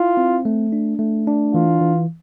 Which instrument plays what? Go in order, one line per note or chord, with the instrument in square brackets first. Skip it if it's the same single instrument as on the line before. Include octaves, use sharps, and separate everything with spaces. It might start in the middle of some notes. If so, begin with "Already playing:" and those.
Already playing: [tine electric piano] E4 [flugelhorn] F4
[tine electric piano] C4
A3
D4
A3
D4
[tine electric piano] E3 [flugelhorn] F4
[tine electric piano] E3